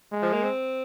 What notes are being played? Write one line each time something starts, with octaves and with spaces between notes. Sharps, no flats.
G#3
F3
A#3
C4